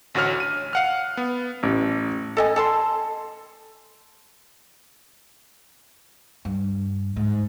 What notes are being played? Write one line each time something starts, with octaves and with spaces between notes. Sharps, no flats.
A1 D2 F#4 C#5 F6
D#7
F5 F#5 F6
B3
A1
A4 D#5 G#5
A4 A5 C6
G2
G#2